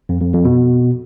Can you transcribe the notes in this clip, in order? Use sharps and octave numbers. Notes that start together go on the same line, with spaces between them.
F2
F2
F2
B2